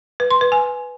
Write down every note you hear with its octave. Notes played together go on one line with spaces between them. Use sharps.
B4
C6
B4
G#5